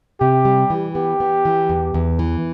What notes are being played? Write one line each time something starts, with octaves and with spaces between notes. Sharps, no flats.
C3 G4
G3
E3
B3 G4
B3
E3
E2
E2
E3